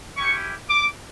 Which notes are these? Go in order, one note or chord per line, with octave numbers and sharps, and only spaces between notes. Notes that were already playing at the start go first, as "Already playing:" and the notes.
C#4 E4 G4 C#6
D6